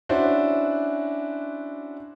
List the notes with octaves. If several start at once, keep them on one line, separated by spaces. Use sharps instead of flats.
C#4 D4 E4 F#4 C5